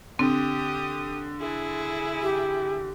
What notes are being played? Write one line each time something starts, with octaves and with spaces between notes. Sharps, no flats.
D3 C4 G4 D#6
E4 G#4
G4